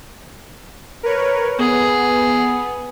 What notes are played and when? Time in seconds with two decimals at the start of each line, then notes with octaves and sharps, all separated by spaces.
1.03 A#4 B4 C#5
1.58 B3 G#4